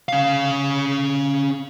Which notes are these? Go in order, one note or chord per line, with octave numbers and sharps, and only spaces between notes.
C#4 F5